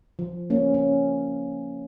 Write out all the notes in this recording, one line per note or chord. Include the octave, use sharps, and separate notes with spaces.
F3
A#3 C#4
C#4